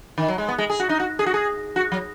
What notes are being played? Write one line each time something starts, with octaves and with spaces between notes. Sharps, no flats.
D#3
F#3
G#3
B3
G#3
G#4
F#4
D#4
F#4
G#4
F#4
G#4
F#4
F#3